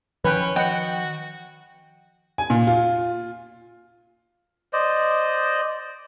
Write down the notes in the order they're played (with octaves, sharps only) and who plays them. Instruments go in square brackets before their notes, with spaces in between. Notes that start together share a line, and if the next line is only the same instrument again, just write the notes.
[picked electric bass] D#3 F3 [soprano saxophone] C#4 [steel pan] B4 G5
[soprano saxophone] F#4 [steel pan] D#5 F#5 [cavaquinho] G5
[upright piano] G#5
A#2
F4
[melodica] C5 D5 D#5